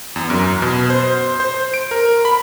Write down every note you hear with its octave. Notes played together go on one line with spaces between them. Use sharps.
E2
F#2
B2
C5
C5
D7
A#4
B5